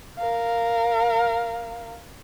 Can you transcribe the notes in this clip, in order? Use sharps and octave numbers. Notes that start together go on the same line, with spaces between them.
A#4 F5